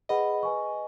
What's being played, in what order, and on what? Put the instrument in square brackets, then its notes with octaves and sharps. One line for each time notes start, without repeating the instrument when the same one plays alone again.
[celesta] G#4 B4 F#5 B5 [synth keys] D#5
[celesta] B4 G#5 C#6